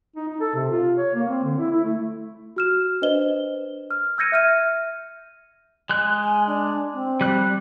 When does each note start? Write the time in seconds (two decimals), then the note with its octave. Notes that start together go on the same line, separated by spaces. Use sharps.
0.16 D#4
0.28 D#4
0.41 A4
0.55 C3
0.71 F4
0.97 C#5
1.15 A#3
1.28 C4
1.44 D3
1.59 E4
1.71 E4
1.84 A3
2.56 F#4 F6 E7
3.02 D4 B4 C5 D#5 G7
3.91 F6
4.18 E6 G6 G#6 A#6 C#7 D#7
4.32 E5 F6 D#7
5.90 G#3 F#6
6.24 G#5
6.47 D4
6.93 C4
7.21 G3 F#6